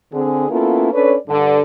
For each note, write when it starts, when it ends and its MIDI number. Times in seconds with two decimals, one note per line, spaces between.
0.13 0.49 50
0.13 0.49 60
0.13 0.49 68
0.50 0.92 58
0.50 0.92 59
0.50 0.92 61
0.50 0.92 64
0.50 0.92 65
0.50 0.92 69
0.93 1.16 61
0.93 1.16 62
0.93 1.16 69
0.93 1.16 71
0.93 1.16 73
0.93 1.16 74
1.28 1.61 43
1.28 1.61 50